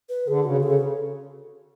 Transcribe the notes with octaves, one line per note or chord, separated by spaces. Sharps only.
B4
D3 G#4
C#3 F#4
C#3 A4